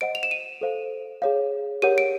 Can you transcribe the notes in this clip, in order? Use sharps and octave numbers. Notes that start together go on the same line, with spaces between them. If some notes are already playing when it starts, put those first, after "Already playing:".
C5 D#5 F#5 D7
F7
E7
D#7
A4 C5 F5
G#4 C#5 F5
G4 A#4 C#5 F#5 D#7
D7